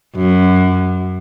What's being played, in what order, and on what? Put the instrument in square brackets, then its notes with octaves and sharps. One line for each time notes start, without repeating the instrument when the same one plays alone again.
[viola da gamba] F#2